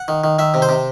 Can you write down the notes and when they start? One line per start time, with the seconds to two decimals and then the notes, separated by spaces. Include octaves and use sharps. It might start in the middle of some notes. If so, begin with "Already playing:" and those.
Already playing: F#5
0.08 D#3
0.24 D#3
0.39 D#3 E5
0.54 C3
0.62 C5
0.69 C3